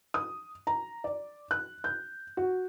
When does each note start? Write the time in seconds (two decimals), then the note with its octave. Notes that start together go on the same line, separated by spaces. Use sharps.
0.14 D#6
0.67 A#5
1.04 D5
1.51 F#6
1.84 G6
2.37 F#4